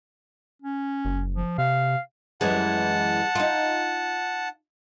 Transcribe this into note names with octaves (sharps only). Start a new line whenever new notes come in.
C#4
F#1
F3
C3 F5
F#2 E3 G#3 F#5 A5
D#4 F4